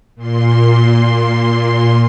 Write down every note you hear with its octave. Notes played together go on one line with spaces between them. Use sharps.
A#2 C6